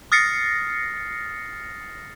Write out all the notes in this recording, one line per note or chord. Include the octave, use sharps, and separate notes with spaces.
D#6 F6 A6 A#6 C7 C#7